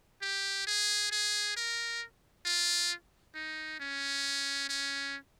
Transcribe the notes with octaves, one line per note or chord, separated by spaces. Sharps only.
G4
G#4
G#4
A#4
F4
D#4
C#4
C#4